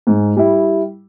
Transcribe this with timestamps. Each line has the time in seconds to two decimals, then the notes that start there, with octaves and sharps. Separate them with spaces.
0.07 G#2
0.36 G3 E4